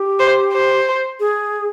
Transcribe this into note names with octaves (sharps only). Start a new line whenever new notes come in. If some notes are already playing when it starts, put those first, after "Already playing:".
Already playing: G4
C5
C5
G#4